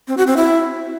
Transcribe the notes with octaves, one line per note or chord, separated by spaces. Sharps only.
C4
F#4
C4
E4